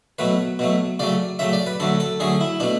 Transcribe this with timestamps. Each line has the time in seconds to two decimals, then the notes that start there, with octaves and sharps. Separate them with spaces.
0.19 B2 F#3 A3 B4
0.59 B2 F#3 A3
0.99 C#3 F#3 A3 D5
1.39 C#3 F#3 A3 E5
1.53 D5
1.66 B4
1.80 D3 F#3 A3 A4
2.00 A4
2.20 D3 F#3 A3 G#4
2.41 E4
2.60 B2 A3 D4